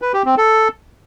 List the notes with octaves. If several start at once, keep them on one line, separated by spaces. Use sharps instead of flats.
B4
G4
C4
A4